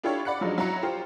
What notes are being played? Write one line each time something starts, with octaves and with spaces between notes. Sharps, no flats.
D4 E4 F4 G4 A4 C#5
D5 F#5 B5 F#6 C#7
F3 F#3 G#3 D4 D#4
F#3 E4 A#5 C#7
F4 G4 C5